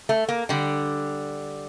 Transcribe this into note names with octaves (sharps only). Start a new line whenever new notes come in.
A3
A#3
D3 G3